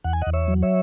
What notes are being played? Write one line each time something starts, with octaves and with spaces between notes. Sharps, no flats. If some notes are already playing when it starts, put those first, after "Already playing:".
E2 F#5
G#5
D#5 F#5
E2
C#5 E5
F#3
C#5 E5